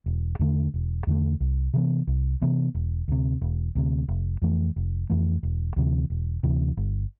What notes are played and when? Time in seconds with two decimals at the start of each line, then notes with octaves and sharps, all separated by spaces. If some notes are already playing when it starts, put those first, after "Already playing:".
0.06 E1
0.39 E2 D3 A3
0.74 E1
1.07 E2 D3 A3
1.40 C2
1.74 C3 E3 B3
2.07 C2
2.42 C3 E3 B3
2.75 E1
3.08 D2 C3
3.41 E1
3.75 D2 C3
4.08 F1
4.42 F2 E3 A3
4.76 F1
5.10 F2 E3 A3
5.43 E1
5.76 D2 C3 E3
6.10 E1
6.43 D2 C3 E3
6.77 G1